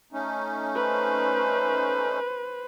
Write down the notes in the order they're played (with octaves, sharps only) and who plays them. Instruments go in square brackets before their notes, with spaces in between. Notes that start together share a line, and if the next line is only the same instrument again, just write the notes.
[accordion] A3 C#4 D#4
[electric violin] B4 C5